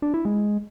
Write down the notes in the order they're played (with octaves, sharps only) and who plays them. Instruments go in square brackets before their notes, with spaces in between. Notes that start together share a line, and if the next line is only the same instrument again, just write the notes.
[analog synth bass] D4
E4
G#3